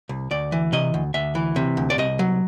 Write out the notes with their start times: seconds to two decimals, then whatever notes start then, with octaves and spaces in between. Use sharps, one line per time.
0.09 C2
0.31 D2 D5
0.52 E3
0.73 C3 D#5
0.94 D2
1.14 D2 E5
1.35 E3
1.56 C3
1.77 D2
1.90 D5
1.98 C2 D#5
2.19 F#3